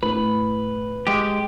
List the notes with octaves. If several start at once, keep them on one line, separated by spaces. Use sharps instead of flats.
A2 B4
G#3 G4